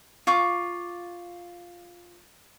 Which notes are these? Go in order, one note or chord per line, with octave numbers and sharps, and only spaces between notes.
F4 C#6 D6